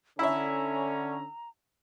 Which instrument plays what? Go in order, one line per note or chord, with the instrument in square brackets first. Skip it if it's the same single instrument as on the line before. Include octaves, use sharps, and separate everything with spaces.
[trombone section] D3 C#4 [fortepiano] E4 E5 [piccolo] A#5